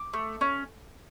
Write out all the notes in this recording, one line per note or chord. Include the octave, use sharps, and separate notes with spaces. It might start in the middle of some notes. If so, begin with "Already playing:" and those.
Already playing: D6
A3
C#4